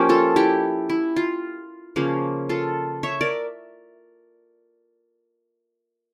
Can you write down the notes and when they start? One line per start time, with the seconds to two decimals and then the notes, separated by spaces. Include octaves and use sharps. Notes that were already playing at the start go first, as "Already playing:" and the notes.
Already playing: F3 A#3 C#4 G4
0.09 F4 A4
0.36 E4 G4
0.90 E4
1.16 F4
1.96 C#3 F3 A#3 C#4
2.49 F4 A4
3.03 C#5 E5
3.21 A#4 D5